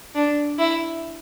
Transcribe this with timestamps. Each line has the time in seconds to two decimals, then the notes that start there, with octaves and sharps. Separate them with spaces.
0.15 D4
0.59 E4